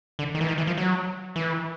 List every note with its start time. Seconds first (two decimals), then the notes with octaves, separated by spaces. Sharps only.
0.19 D3
0.35 D#3
0.41 E3
0.48 D#3
0.58 E3
0.67 F3
0.77 F#3
1.36 E3